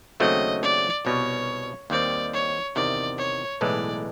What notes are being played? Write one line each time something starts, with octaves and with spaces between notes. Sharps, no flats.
D#2 C#3 F#3 A3 C4 D#5
D5
C2 B2 G3 C#5
D#2 D#3 G3 C4 D5
C#5
E2 C3 D#3 D5
C#5
B1 A2 E3 G#3 D5